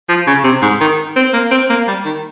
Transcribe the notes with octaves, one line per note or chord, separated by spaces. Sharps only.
F3
C#3
C3
G#2
D#3
C4
A#3
C4
A#3
G3
D#3